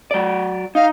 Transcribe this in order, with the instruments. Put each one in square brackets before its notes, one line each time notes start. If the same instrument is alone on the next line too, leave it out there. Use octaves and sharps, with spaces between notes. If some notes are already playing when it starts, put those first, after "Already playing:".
[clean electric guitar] F#3 D5
[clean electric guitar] D#4 [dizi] F5